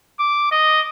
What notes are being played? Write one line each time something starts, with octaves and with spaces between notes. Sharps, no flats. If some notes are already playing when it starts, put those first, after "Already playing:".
D6
D#5